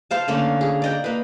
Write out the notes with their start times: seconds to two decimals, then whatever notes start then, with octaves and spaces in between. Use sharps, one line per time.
0.11 C5 F5 A5
0.28 D3 A3 A#3 C#4
0.61 G#4
0.82 D5 D#5 G5
1.04 A#3 B4